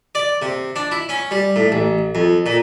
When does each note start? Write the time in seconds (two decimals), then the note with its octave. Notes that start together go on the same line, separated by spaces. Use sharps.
0.15 D5
0.42 C3
0.76 D4
0.92 E4
1.09 C#4
1.31 G3
1.56 A2
1.72 A1
2.15 F2
2.46 A#2